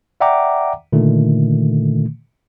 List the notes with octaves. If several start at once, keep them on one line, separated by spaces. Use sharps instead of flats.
D5 E5 F#5 G5 A#5 D6
A#2 D3 D#3 A3